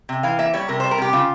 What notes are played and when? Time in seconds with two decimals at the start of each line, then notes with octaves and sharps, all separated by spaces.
0.09 C3
0.23 E3 F5
0.39 A#3 E5
0.54 G3 C#5
0.68 C3 A#4
0.80 G3 C5
0.91 A#4
0.98 C3 G4
1.13 C#3 F4